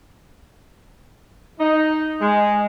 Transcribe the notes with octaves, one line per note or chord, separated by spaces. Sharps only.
D#4
G#3